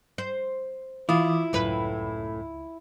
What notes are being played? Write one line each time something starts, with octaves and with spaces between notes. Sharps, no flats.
C5
E3 E4 F4 D6 D#6
C#2 F#2 A2 B4